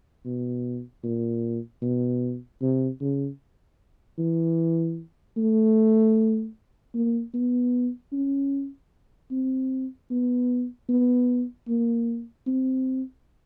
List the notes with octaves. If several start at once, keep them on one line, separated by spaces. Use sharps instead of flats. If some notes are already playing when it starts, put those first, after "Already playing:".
B2
A#2
B2
C3
C#3
E3
A3
A#3
B3
C#4
C4
B3
B3
A#3
C4